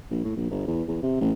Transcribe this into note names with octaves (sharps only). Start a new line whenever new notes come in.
A#1
A2
A#1
G1
E2
E2
C3
A1